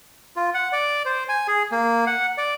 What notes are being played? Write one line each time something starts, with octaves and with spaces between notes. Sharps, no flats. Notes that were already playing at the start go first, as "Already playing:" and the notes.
F4
F#5
D5
C5
G#5
G#4
A#3
F#5
D5